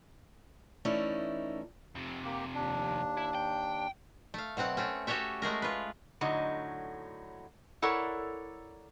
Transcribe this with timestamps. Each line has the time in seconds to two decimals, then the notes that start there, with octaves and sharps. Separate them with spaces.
0.85 E3 A3 C#4 D#4 E4 D5
1.95 F2 C3
2.24 A#3 G4
2.54 D#2 D4
3.17 E4
3.34 G5
4.34 A3 F5
4.57 B2 F#3 C4 F#5
4.77 A3 C4 C#4
5.07 F#4 G4 A4 C#5 E5
5.42 G#3 A3 G#4 A#4
5.62 F4 B4
6.21 A2 D3 F#3 D#4 D#5
7.82 E4 A4 A#4 C#5 D5 F#5